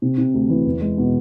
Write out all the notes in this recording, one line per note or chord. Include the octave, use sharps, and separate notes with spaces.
C3
C3
D2
E3
E2
G#3
B2